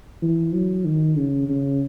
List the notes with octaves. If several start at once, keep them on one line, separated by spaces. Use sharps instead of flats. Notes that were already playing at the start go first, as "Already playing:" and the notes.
E3
F#3
D#3
C#3
C#3